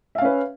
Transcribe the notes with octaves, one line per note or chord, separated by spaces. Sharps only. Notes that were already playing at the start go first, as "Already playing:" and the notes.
C#4 B4 E5 F5